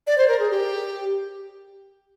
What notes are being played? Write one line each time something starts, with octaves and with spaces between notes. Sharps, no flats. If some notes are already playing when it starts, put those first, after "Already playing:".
D5
C5
A#4
G#4
G4